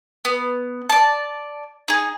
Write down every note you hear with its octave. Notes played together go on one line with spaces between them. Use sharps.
B3
D5 A5
D#4 G#4